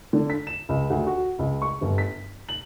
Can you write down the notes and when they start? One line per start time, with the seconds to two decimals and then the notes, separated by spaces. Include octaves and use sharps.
0.13 D3
0.30 B6
0.47 E7
0.69 C#2
0.90 D2
1.06 F#4
1.39 C#2
1.62 C#6
1.81 G1
1.98 B6
2.49 F#7